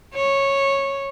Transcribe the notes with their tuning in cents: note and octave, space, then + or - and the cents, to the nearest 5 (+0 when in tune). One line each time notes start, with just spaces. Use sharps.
C#5 -10